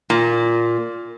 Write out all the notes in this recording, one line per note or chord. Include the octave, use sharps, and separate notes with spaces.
A#2